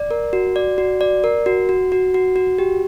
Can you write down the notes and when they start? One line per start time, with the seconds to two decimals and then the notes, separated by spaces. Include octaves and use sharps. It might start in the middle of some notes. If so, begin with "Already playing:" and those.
Already playing: D5
0.11 A#4
0.33 F#4
0.56 D5
0.78 F#4
1.01 D5
1.24 A#4
1.46 F#4
1.69 F#4
1.92 F#4
2.14 F#4
2.36 F#4
2.59 G4